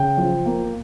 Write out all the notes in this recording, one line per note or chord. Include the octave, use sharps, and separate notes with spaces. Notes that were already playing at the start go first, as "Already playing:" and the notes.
Already playing: C#3 G5
F3
A#3